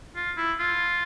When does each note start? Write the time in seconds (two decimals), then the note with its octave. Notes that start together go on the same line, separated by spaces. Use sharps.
0.15 F4
0.37 E4
0.60 F4